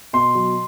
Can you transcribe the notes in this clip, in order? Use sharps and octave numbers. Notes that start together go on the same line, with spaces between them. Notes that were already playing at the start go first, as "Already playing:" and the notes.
B2 C6
F#3